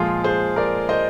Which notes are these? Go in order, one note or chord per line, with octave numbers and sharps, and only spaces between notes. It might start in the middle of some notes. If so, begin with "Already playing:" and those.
Already playing: A#2 F3 G#3 F4 G#4
G#4 C5
A#4 D5
C5 D#5